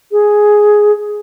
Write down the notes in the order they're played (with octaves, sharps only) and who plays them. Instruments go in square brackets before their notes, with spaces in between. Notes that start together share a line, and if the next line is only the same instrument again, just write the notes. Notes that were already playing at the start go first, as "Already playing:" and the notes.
[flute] G#4